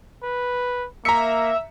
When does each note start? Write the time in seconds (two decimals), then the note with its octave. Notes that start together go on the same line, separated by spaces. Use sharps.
0.24 B4
1.05 A#3 E5 A#5 C#7